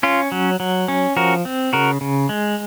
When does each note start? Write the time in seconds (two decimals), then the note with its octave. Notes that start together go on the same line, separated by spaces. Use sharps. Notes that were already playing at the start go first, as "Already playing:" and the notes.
0.03 C#4 F4
0.32 F#3
0.60 F#3
0.88 C#4
1.17 F3 F#4 A#4
1.45 C4
1.73 C#3 F#4 A#4
2.01 C#3
2.29 G#3